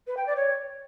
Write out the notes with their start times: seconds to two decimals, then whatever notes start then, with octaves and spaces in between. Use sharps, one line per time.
0.07 B4
0.17 G5
0.26 D5
0.36 C#5